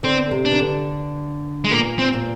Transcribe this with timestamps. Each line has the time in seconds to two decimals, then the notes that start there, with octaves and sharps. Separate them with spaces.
0.03 D3 C4
0.31 C3
0.45 D4
0.51 D#3
0.59 D3
1.64 G#3
1.71 A#2 A#3
1.99 C4
2.13 A#2